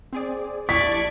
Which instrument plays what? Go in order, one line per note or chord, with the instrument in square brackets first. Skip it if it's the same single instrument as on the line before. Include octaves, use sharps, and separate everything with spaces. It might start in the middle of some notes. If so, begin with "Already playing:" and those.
[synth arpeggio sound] C4 G#4 D5
[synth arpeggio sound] A#1 E4 A5 [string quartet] D5 C#6 G#6 [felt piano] B6